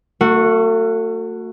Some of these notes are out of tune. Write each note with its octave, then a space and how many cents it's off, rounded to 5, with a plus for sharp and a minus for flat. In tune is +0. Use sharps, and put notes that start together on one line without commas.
A3 +40 F#4 -10